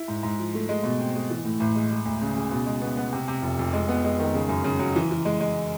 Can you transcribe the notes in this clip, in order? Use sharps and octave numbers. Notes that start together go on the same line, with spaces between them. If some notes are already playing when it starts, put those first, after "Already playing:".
Already playing: E4
G#2
G#2
F3
A3
G#3
B2
C4
G#3
E3
A2
A1
G#3
G#3
D2
C#3
C#3
B2
G#3
B3
B3
C3
C3
F1
F1
G#3
B3
G#3
D#3
C#3
F#2
C#3
F#3
E3
E3
G#3
G#3